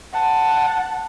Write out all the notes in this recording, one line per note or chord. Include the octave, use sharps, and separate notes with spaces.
F#5 A5